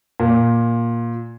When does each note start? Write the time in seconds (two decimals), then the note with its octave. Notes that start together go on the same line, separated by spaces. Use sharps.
0.20 A#2